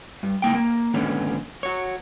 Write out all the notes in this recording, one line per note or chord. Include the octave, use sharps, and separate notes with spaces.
G2
C#2 A#3 G5
A#3
D#2 G#2 D3 B3 C#4
F#4 C#5